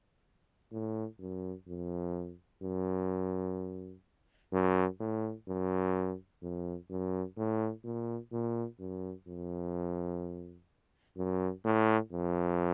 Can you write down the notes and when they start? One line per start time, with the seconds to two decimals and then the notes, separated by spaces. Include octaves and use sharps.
0.72 A2
1.20 F#2
1.68 F2
2.62 F#2
4.53 F#2
5.00 A2
5.48 F#2
6.42 F2
6.90 F#2
7.37 A2
7.85 A#2
8.32 A#2
8.80 F#2
9.27 F2
11.17 F#2
11.64 A2
12.12 F2